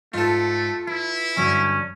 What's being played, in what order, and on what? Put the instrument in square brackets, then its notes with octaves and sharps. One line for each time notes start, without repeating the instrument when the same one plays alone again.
[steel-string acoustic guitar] G#2 [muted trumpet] A3 [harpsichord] F4 A4
[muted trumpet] E4 [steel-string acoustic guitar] B4
[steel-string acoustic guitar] G2 D3 F#3 [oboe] C#4